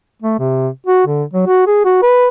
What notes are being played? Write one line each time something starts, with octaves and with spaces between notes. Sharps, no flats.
A3
C3
F#4
D3
F#3
F#4
G#4
F#4
B4